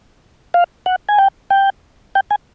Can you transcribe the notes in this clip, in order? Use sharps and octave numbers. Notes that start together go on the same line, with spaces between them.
F5
F#5
G#5
G5
G5
G5
G#5